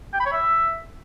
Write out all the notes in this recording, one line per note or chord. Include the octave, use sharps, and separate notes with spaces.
G5
B5
C#5
E5